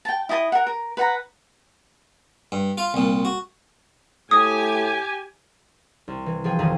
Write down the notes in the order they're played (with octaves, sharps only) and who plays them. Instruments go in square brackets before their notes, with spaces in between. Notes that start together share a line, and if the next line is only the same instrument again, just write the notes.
[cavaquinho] G5 A5
E4 D#5 G#5 D#6
A#4 F#5
A#4
B4 F#5 A#5
[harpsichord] G2
F4 F5
C2 A#2
F#4
[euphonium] A2 [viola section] G4 G#5 [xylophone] D#6
[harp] C2
E3
F3 G#4 G5
G#1 F2 A2 D#3 G#4 D#6